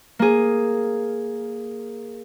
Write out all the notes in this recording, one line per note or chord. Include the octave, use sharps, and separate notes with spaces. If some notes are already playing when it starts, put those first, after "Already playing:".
A#3 G#4